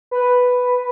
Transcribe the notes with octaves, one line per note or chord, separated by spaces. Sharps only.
B4